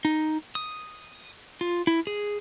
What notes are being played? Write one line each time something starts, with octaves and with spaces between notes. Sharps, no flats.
D#4
D#6
F4
E4
G#4